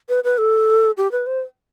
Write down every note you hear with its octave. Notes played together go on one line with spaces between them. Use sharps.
B4
B4
A4
G4
B4
C5